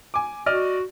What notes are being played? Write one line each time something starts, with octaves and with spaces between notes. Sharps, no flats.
G#5 D6
F#4 D5 D#5 F6